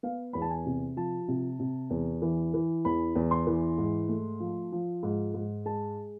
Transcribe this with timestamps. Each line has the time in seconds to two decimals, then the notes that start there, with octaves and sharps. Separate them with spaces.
0.03 B3 F5
0.33 E2 B5
0.42 A5
0.50 G#5
0.66 C3
0.97 F3 A5
1.28 C3
1.60 C3
1.90 E2
2.22 E3
2.54 E3
2.85 E2 B5
3.16 E2
3.31 C6
3.47 E3
3.78 G#2
4.09 A3
4.40 F3
4.72 F3
5.03 G#2
5.34 G#2
5.65 G#3 A5